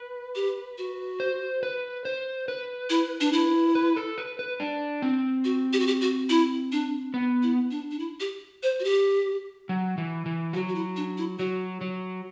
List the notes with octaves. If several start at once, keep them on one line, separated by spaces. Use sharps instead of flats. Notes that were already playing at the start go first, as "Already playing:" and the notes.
Already playing: B4
G4
F#4
C5
B4
C5
B4
E4
D4
E4
B4
A4
B4
B4
D4
C4
F#4
G4
F#4
G4
F#4
E4
D4
B3
E4
D4
D4
E4
G4
C5
F#4
G4
F#3
E3
E3
F#3 F#4
F#4
E4
D4
E4
F#3 F#4
F#3